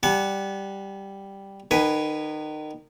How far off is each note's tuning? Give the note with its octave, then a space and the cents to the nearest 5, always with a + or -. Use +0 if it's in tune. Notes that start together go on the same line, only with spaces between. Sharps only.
G3 +0 F#5 +0 A5 -45
D#3 -30 B4 +0 G#5 +0